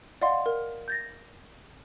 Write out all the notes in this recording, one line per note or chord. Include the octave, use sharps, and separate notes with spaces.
D5 D#5 F5 F#5 C6
A#4
G6 A6 A#6